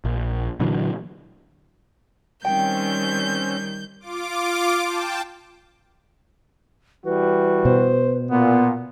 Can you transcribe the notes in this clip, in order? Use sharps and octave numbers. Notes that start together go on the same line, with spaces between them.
A#1
A#2 D3 E3 F#3
D#3 G3 C4 C#4 G5 G6
F4 D6
G5 A5
E3 G3 F#4 B4
B2 C5
A#2 B3